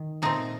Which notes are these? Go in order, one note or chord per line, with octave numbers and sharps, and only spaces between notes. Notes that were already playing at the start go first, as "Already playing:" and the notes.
Already playing: D#3
A#2 A3 C4 D#4